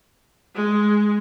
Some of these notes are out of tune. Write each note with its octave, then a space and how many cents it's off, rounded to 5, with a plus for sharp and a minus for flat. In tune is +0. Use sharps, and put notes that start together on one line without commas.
G#3 +5